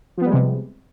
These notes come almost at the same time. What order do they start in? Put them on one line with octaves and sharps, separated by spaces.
F3 B3 G3 G#3 C3